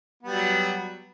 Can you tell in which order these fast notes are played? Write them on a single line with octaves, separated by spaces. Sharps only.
B3 G3 F#3